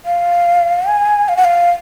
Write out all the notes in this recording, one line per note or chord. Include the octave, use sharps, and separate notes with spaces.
F5
G#5
F5
F#5
F5